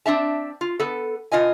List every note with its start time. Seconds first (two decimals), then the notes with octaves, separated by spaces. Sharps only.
0.06 C4 D4 E5 A5
0.61 F4
0.80 B3 A4
1.32 B2 F4 D#5 G#5